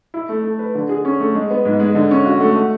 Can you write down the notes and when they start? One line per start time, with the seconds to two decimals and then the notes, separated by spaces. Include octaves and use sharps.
0.14 E4
0.29 A3
0.44 A3
0.59 B4
0.75 D3
0.89 G#4
1.05 C#4
1.20 A3
1.35 G#3
1.51 B3
1.65 G#2
1.80 G#3
1.95 D3
2.11 C#4
2.26 F#4
2.40 A3
2.56 A3